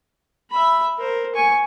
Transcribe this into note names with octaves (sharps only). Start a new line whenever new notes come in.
E5 B5
A#4 C5
G#5 C#6